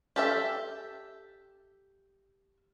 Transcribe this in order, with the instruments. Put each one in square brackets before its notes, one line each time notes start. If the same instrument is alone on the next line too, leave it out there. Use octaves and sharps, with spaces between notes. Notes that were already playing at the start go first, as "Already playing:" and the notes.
[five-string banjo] G4 A4 E5